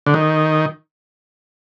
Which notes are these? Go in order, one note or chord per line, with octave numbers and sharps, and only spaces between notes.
D3
D#3